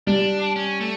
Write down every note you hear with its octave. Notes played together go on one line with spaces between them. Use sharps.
G3 D4
C#4
A3